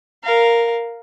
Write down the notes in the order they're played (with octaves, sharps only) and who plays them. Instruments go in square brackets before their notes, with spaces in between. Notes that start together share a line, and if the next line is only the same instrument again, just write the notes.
[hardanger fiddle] A#4 F5